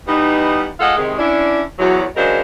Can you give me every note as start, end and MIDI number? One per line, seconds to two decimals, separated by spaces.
0.07 0.67 52
0.07 0.67 55
0.07 0.67 59
0.07 0.67 63
0.80 0.96 56
0.80 0.96 65
0.80 0.96 69
0.80 0.96 75
0.80 0.96 77
0.80 0.96 78
0.97 1.17 48
0.97 1.17 51
0.97 1.17 56
1.19 1.62 61
1.19 1.62 62
1.19 1.62 64
1.79 2.04 40
1.79 2.04 54
2.16 2.41 49
2.16 2.41 54
2.16 2.41 56
2.16 2.41 62
2.16 2.41 70
2.16 2.41 72